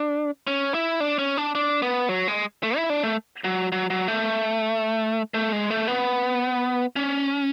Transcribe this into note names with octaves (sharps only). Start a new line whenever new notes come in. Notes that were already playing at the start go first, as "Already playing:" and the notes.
Already playing: D4
C#4
E4
D4
C#4
D4
D4
B3
F#3
G#3
A3
E4
D4
A3
F#3
F#3
F#3
A3
A3
G#3
A3
B3
C#4